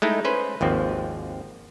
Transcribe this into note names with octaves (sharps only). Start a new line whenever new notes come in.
G#3 A3 D#4 E4
C#4 B4 C5
G#1 D#2 F3 C4